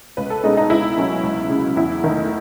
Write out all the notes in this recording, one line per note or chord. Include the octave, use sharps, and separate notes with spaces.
C#2 B4
A4
B2 G#3 C#4 D#4
D#4
C#2 E4
B2 F#3 C#4
C#2
C#3
F#3
E2 E4
D#3 A3 D#4